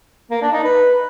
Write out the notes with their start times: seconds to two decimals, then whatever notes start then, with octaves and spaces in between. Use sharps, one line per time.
0.31 A#3
0.42 D4
0.53 D#4
0.64 B4